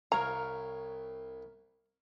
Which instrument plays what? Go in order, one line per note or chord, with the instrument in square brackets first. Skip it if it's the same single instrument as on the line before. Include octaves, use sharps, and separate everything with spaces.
[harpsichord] C2 [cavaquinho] A#4 C#5 F5 [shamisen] A#5